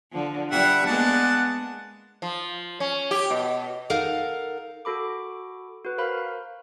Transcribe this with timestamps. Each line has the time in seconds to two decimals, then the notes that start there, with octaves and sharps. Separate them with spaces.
0.12 D3 F3
0.51 G2 G3 E5 F#5
0.86 G#3 A#3 B3 D4 F#5 A5
2.22 F3
2.80 C#4
3.11 G4
3.30 B2
3.90 D#4 A4 A#4 F5 F#5
4.85 F#4 A4 B5 D6
5.85 F#4 B4
5.98 A#4 C5 F5 B5